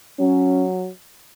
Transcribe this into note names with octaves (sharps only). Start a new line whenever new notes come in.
F#3 C#4